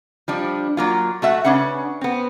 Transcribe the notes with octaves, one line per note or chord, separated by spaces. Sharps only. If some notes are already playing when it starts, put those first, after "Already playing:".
F3 G3 D4
F#3 A#3 F4
A3 F#4 E5 F#5
C#3 C#4 D4 B4 F#5
B3 C4